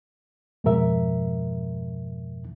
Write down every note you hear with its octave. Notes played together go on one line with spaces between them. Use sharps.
F2 G#2 B2 F3 A#4 E5